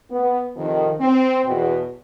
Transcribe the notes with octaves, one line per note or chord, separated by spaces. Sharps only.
B3
F2 C3 D#3
C4
E2 B2